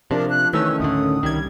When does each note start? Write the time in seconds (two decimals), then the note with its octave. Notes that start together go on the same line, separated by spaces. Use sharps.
0.11 C3 F3 D4 A#4
0.30 F#6
0.53 D#3 E3 A3 C#4 E6
0.80 D2 A2 D3 D#6
1.23 C2 D#3 G3 G#6